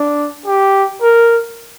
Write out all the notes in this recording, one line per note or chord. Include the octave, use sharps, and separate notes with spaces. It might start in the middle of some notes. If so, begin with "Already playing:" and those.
Already playing: D4
G4
A#4